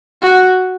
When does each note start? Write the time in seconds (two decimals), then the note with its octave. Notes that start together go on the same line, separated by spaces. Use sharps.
0.22 F#4